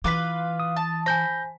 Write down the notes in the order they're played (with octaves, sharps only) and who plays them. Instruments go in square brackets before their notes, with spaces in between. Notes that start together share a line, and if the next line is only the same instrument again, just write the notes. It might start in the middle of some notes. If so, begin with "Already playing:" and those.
[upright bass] E3 [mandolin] F4 B4 F5 [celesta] D6 B6
[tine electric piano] D#6
[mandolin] A5
[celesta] C5 G#5 [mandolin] B5 [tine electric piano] G6 A#6